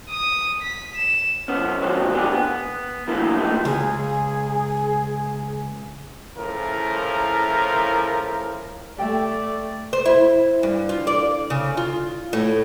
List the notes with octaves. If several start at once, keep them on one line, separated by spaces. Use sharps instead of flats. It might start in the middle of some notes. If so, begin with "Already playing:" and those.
D#6
B6
E7
F#2 B3 C#4
D3 F3 G#3 C4 F#4 C#5
D#3 B3 D4 F4 G4 G#4
B3
F#2 D3 E3 A3 A#3 E4
A#2 D#3 F3 A3 D#4
C#2 G#4
A2 C#3 F3 E4 A#4
A3 G4 D5 G5
C5
E4
G2
F4
D5
C#3
F4
A2